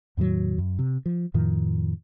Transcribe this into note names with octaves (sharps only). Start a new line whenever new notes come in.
E2 A2 D#3 F#3
F#2
C3
F3
F2 A2 D#3 F3